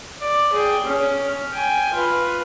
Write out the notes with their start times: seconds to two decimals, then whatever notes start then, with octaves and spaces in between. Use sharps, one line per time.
0.20 D5
0.53 G#4 G5
0.85 C#4
1.53 G5 G#5
1.94 F4 B4